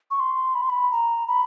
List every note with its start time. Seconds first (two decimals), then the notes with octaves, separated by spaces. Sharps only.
0.11 C#6
0.20 C6
0.55 B5
0.63 C6
0.70 B5
0.92 A#5
1.28 B5